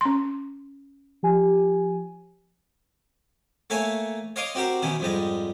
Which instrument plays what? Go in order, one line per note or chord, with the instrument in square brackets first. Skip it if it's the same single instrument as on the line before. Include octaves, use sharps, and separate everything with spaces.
[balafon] C#4 C6
[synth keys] F3 G4 G#5
[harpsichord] A3 A#3 C#5 E5 G#5
C#5 D#5 F5 C6 D6 D#6
C4 F#4 G4 A#4 C5
B2 D#3 C#4 E4
F2 G#2 G3 D#5